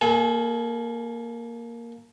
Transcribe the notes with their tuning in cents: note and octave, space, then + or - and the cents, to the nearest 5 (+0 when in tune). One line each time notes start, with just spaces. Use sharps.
A#3 +0 A4 -40 G#5 +0